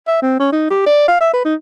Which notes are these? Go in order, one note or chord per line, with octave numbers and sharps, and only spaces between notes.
E5
C4
C#4
D#4
G4
D5
F5
E5
B4
D#4